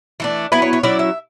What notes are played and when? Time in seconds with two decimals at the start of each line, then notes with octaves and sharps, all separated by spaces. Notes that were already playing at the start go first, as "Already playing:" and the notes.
0.20 E3 A3 D4
0.52 F#3 B3 E4 B4
0.62 C#5
0.73 C#5
0.83 F#3 C#4 E4 D5
0.99 E5